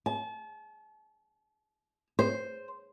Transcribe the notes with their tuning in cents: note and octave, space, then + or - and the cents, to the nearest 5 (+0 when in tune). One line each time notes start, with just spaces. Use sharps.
A5 -35
C5 +0